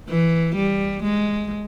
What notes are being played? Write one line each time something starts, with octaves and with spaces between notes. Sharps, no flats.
E3
G3
G#3